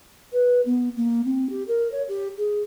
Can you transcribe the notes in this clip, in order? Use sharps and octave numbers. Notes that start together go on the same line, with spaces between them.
B4
B3
A#3
C4
G4
A#4
C#5
G4
G#4